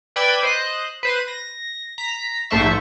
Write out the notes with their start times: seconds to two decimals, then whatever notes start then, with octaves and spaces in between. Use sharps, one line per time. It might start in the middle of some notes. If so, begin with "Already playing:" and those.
0.16 B4 D5 G5 B5 E6 G#6
0.43 C5 D#5 F#6
1.03 B4 C5 D#7
1.28 A#6
1.98 A#5 B6
2.50 A#1 G#2 A3 C5 E5 C#6